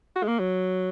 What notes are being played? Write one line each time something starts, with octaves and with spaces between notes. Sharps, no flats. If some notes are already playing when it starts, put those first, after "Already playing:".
F#4
G#3
A#3
F#3